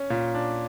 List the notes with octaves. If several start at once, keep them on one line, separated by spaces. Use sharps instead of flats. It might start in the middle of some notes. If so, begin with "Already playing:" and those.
Already playing: C#4
A#2
D4